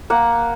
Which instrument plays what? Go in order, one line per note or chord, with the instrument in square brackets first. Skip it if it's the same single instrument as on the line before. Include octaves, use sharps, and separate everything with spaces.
[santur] A#3 F#5